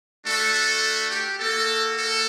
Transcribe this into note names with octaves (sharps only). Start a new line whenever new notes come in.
A3 D4 F#4 A4
A4
G4
A#3 F#4 A4
A4